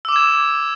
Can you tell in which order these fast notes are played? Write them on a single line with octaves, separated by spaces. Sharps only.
E6 D6 E7 G#6